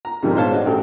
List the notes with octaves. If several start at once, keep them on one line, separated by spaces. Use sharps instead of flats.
A#5
G#2 C3 D#3 F3 G3 G#3
G#2 B2 C5 C#5 F5 A5
D4 F#4 D#5
A1 A4 G5